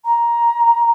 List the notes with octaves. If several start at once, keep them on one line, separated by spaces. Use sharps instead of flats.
A#5